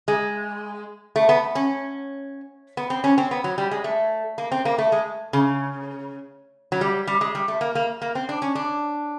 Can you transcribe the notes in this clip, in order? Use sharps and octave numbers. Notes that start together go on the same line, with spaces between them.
G#3
A3
B3
C#4
B3
C4
C#4
C4
B3
F#3
G3
G#3
A3
A#3
C4
A#3
A3
G#3
C#3
F#3
G3
G3
G#3
G3
A3
A#3
A#3
A#3
C4
D4
C#4
D4